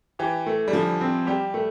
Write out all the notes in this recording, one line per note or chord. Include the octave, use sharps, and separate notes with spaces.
E3 G4
A3
G3
D3 F3
C4
G3 G4
A3